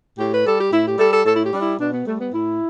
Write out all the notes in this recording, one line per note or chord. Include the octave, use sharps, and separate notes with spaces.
A2 G4
B4
G3 A4
G4
A2 E4
G4
G3 A4
A4
A2 A4
E4
G4
G3 D4
E4
B2 D4
B3
G3 A3
B3
A2 E4